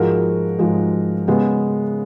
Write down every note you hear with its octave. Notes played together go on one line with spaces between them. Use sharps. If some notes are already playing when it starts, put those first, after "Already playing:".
Already playing: G#2 F3 G#3 F#4 A#4
G#2 F3 G#3
C#3 G#3 B3